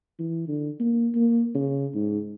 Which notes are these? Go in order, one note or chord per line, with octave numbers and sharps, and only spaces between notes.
E3
D3
A#3
A#3
C#3
G#2